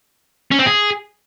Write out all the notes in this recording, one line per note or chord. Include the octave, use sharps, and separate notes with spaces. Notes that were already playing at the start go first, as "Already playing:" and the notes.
C#4
C4
G#4